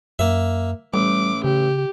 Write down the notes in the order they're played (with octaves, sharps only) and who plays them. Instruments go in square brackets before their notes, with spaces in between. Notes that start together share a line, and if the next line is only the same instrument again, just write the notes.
[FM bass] F#2 [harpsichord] A#3 E5
[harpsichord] A1 [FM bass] G3 [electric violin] D6
[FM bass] C#3 [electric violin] G4